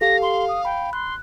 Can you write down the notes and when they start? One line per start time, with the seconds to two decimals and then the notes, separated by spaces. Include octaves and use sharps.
0.01 G4 A4 F5 A#6
0.22 C6
0.49 D#6
0.65 G5 B5
0.93 C6 F#6